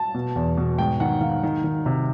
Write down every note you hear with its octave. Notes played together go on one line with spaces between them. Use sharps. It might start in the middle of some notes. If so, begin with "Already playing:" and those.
Already playing: A5
B2
E2
B2
G#2 G5
D#3 F#5
D#3 F5
D#3
D#3
C3